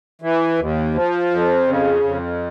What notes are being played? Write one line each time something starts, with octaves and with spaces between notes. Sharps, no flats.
E3
D#2
F3
F2
C#3
F2